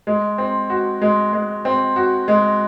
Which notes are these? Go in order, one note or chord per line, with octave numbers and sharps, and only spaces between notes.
G#3
C4
F#4
G#3
G#3
C4
F#4
G#3